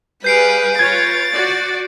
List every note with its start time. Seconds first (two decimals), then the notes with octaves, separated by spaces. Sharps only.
0.24 G3 G#4 B4 F5 G6 C7 D7
0.79 F4 B4 C#5 G#6 A6
1.33 F#4 D5